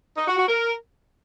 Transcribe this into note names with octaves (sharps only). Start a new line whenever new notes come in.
D#4
F#4
F#4
A#4